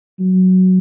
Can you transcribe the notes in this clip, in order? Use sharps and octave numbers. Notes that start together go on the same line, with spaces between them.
F#3